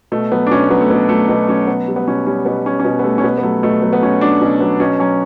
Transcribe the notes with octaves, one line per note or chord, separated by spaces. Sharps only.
B2 A3
F#3 B3
D4
B2 C#4
F#3 B3
A3
B2 B3
F#3 A3
B2 B3
F#3 C#4
B2 B3
G3
B3
B2 C#4
G3 C#4
B2 B3
G3 C#4
C#4
B2 B3
B3
G3 A3
C#4
B2 B3
B3
F#3 A3
B2 A3
F#3 B3
B3
B2 C#4
F#3 D4
B2 C#4
F#3 B3
B2 C#4
F#3 C#4